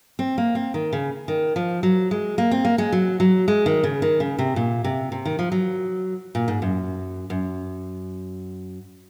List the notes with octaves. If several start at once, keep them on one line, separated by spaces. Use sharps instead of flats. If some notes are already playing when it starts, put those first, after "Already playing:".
C4
A#3
C4
D#3
C#3
D#3
F3
F#3
G#3
A#3
C4
A#3
G#3
F#3
F#3
G#3
D#3
C#3
D#3
C#3
C3
A#2
C3
C3
D#3
F3
F#3
A#2
G#2
F#2
F#2